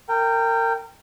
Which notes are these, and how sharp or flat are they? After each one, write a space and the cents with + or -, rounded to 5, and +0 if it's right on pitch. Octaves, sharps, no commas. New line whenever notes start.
A#4 -30 G5 +0